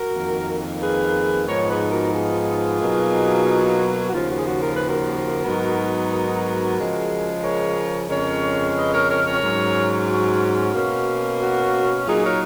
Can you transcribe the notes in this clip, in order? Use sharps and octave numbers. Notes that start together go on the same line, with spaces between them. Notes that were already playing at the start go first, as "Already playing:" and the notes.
Already playing: F#4 A#4
F2 D#3 A#3
G#4 B4
G#2 F3 B3 D#4 A#4 C#5
G#4 B4
F#4 A#4
F4 G#4
B2 F#3 A#3 D#4
F#4
D#2 C#3 F3 F4
F#4
G#4
F#4
A#4
B4
F#4 A#4
G#2 F#3 B3 D#4
F#4 A#4
C#3 F3 G#3
A#4 C#5
F2 C#3 G#3 C#4 A#4 C#5
B4 D#5
A#4 C#5
A#4 C#5
A#4 C#5
G#2 F#3 C#4
F#4
B2 A#3 C#4
F#4
A#2 F#3 A#3 D#4 F4 G#4
A#4 C#5